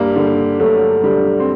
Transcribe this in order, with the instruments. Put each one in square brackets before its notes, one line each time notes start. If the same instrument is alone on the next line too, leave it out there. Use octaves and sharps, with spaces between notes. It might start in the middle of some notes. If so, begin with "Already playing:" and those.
Already playing: [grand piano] G2 G3 A#3
D3
G2 F#3 A3
D3 G3
C4